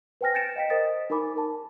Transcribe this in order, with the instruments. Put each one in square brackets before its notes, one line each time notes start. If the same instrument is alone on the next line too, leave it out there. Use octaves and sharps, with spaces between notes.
[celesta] B4 C5 G5 G#5 F6 A#6
G6 A6 A#6 C#7 D7 E7
D#5 F5 G5 A#5 B6
A#4 C5 D#5 D#6 A6
D#4 A#4 G#5 B5 D6
A#4 A5